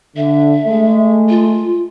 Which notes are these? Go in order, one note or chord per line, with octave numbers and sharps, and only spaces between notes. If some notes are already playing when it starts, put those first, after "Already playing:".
D3 E5
G#3 A3
F4